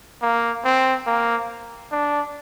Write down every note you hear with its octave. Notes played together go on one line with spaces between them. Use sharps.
A#3
C4
A#3
D4